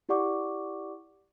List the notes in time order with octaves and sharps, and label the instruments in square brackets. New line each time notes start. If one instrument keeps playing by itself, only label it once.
[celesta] E4 G4 D5 F#5 C#6 D6